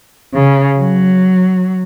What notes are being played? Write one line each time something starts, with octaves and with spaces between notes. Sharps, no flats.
C#3
F#3